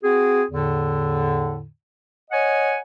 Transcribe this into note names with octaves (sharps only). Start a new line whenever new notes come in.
C4 F#4 G#4
E2 A2 D3
C#5 D#5 F#5 G#5